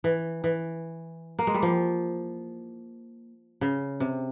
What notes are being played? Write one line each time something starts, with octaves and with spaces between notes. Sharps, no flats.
E3
E3
A#3
G#3
G3
F3
C#3
C3